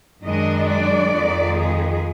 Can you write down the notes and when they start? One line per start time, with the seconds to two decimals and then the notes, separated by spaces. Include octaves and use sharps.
0.25 F#2 D#3 G#3 D4 D#5
0.70 D5
1.14 F2 D#3 G#3
1.58 G#4